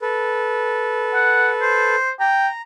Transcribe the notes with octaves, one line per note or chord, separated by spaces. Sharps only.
A4 B4
F#5
C5
G5 A#5